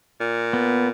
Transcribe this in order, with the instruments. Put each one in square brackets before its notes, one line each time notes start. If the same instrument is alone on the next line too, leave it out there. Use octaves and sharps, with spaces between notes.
[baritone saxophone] A#2
[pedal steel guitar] B3